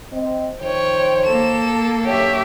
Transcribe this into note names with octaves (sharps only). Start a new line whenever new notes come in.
C4 D#5
D#3 F3 C5 C#5 G5
A#3 A4 E7
F#2 D3 G4 C#5 E5